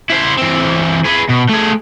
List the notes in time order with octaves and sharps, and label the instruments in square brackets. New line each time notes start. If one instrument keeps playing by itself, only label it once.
[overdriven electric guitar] E4 C5
E3 C4
G#4 B4
B2
A3 G#4